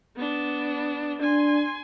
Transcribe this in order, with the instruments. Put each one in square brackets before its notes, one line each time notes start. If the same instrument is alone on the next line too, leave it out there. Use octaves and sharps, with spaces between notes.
[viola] B3 D4
[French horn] D4 [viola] G#5 C6